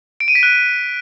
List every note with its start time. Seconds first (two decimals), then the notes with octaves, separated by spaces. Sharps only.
0.20 D7
0.28 D#7
0.35 B6
0.43 F#6